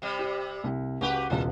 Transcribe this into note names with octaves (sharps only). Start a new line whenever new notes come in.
C3 G3
G4
C2
C#2 F#4 G4 B4
E1 C#2 F3 A#3